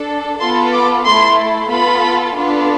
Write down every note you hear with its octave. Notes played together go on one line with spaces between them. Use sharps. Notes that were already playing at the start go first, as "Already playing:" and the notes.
Already playing: D4 A4
B3 F4 A4 C6
D6
A3 E4 A4 C6
B3 F4 A4 B5
B3 D4 F4 A4